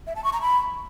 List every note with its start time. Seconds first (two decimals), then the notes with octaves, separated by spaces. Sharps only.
0.07 E5
0.16 A5
0.24 C#6
0.33 A#5
0.42 B5